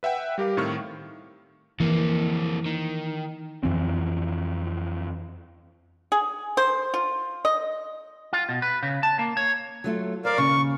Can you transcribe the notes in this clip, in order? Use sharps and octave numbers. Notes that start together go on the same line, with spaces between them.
B4 E5 F#5 G5
G3 G4 A#4 F5
A2 D#3 C4 C#6 F6
F2 E3 A#3
D#3
F2 E3 C4
G#4
C5
F4
D#5
F4
B2
B4
C#3
A5
A#3
C#5
F#3 A3 F4
A#4 C5 D5 F5
D#2 C#3 C#6